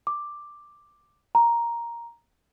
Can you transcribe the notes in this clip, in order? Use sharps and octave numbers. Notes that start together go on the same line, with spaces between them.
D6
A#5